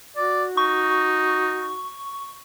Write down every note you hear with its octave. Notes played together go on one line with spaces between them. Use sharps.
F#4 D5
D#4 C#6